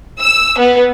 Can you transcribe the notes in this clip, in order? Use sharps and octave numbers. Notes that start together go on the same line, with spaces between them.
E6
B3